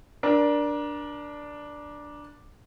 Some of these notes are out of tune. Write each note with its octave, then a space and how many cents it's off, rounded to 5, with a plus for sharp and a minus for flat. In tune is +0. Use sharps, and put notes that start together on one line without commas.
D4 +0 A#4 +30